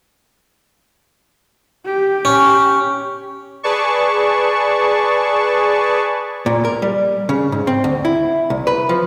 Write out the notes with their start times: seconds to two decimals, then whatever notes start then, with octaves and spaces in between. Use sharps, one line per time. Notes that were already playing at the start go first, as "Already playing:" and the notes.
1.86 G4
2.25 C#4
3.63 G#4 B4 D5 A5 C#6
6.46 A#2
6.65 A#4
6.82 G3
7.29 C#3
7.52 G#2
7.67 C4
7.84 D2
8.05 E4
8.50 C2
8.67 B4
8.89 F3